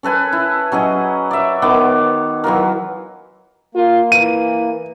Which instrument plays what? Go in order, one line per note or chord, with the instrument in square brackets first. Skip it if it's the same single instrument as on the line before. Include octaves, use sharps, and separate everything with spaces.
[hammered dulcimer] C#4 A4 B4 G#5
E4
F#3 C#4 G#4 D#5
D5 E5
D#3 B3 D6
E3 F#3 F4 A#4
[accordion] A#3 [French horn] F4
[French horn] E3 [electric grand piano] D#7